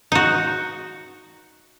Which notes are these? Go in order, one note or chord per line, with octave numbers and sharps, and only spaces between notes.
D#4 F#4